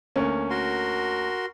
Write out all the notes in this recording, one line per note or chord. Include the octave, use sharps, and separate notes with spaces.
D2 A#3 C#4
F#4 A#4 C6